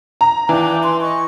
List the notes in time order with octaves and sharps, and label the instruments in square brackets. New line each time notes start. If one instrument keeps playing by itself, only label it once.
[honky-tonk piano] A#5
[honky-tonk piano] E3 [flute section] D4 F5 G5
[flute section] C6
D#5 C#6